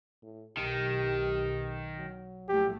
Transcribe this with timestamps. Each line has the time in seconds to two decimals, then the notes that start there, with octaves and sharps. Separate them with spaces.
0.22 A2
0.57 B1 D#3 G4
1.98 F#3
2.48 A#1 A2 A3 G4